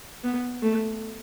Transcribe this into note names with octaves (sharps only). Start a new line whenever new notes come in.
B3
A3